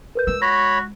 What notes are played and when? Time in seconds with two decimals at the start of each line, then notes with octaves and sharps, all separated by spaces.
0.15 A#4 B4 G6
0.27 G#3 E6
0.42 F#4 C#5 B5 A#6